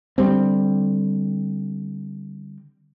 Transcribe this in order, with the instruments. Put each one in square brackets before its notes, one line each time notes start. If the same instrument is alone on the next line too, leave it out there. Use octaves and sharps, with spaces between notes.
[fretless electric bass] D3 G3 C4